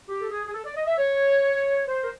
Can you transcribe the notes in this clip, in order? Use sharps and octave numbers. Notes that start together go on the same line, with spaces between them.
G4
A4
G#4
G#4
A4
D5
D#5
E5
C#5
C5
A#4